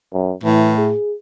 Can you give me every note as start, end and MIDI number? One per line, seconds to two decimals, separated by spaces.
0.13 0.33 42
0.44 0.93 45
0.44 0.73 52
0.78 1.15 68